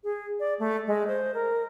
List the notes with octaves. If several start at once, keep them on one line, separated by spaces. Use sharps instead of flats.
G#4
D5
A3
G#3
C5
A#4